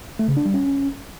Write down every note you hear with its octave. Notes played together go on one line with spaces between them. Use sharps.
A3
C#3
D4
G3
C#4